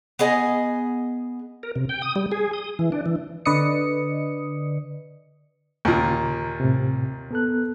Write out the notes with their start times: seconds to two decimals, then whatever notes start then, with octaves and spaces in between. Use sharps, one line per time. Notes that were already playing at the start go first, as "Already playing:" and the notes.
0.19 B3 G#4 D#5 G#5
1.63 A#4
1.76 C3
1.89 G5
2.02 D#6
2.16 G3
2.32 G#4
2.53 D#6
2.79 E3
2.92 D4
3.06 E3
3.45 D3 B4 D5 D#5 D#6 C#7
5.85 D#2 A#2 C#3
6.60 A2 C3
7.31 B3 A4 F#6